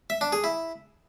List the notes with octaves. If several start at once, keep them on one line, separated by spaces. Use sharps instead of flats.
E5
D4
G#4
E4